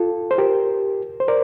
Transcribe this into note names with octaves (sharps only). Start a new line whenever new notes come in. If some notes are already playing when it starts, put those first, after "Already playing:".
Already playing: F4 A4
C5
G4 A#4
C5
A#4 D5